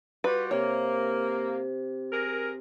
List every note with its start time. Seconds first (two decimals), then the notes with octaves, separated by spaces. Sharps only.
0.24 G3 F4 F#4 B4
0.51 C3 A#3 C#5
2.12 G#4 A#4